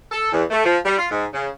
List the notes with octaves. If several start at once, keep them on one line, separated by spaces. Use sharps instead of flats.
A4
E2
A3
F3
G3
F4
G#2
C#3